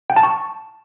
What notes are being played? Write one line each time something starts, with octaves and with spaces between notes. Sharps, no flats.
G5
A5
C#6